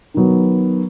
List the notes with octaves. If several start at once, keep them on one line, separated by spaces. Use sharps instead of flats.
D#3 F#3 B3